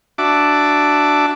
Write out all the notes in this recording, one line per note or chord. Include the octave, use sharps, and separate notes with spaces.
D4 F#4 E5 A5 D6